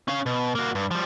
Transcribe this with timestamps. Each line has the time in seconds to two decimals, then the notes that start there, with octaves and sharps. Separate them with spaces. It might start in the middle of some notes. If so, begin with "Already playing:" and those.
0.08 C#4 F5
0.26 B2
0.55 A#3 F#4
0.75 G2
0.91 F3 G3